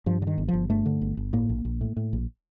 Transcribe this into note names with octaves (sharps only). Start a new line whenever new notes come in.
G2 F3
D3
D#3
G1
G1 F3
G2 A3
D3
G1
G1
A2 A#3
A#1
A#1
A2
A2
A#1